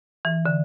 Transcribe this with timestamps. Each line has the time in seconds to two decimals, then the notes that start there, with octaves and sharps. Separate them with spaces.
0.25 E3
0.46 D3